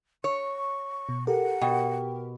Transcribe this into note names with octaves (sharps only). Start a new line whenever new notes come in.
C#5 C#6
B2
G4 A4 A#4 F#5
B2 G5